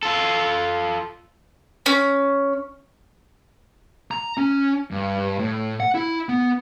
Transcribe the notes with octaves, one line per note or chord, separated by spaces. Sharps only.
F4 A4
C#4
A#5
C#4
G2
A2
F#5
E4
B3